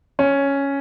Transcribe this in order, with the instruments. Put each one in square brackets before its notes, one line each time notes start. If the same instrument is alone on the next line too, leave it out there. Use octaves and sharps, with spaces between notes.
[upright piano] C#4